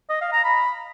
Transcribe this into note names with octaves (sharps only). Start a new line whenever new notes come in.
D#5
F5
A#5
B5